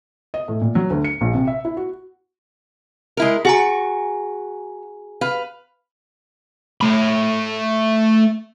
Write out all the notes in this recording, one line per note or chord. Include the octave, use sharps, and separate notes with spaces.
D#5
A2
A#2
F#3
D2
C#7
A#1
C3
E5
E4
F#4
G#3 E4 A#4
F#4 G#4 G#5 A#5
B4 F5
A3 B5